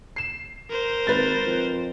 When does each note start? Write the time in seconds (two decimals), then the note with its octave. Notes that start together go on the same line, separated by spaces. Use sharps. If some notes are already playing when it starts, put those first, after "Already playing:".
0.16 C7 E7
0.70 A#4 C5
1.07 G#1 B4 A6
1.47 F2